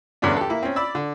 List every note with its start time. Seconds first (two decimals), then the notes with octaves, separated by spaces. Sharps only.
0.22 E2 G2 D3 C#4 D4
0.37 G4 A4
0.50 A#3 E4
0.63 C4 C#4
0.76 D5 B5 E6
0.95 D3